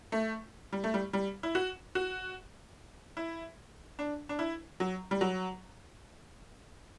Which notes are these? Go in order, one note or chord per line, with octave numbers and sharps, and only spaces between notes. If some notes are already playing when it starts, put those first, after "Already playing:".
A3
G3
A3
G3
G3
E4
F#4
F#4
E4
D4
D4
E4
F#3
G3
F#3